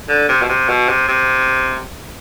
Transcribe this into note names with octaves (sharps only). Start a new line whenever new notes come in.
D3
C3
B2
C3
B2
C3
C3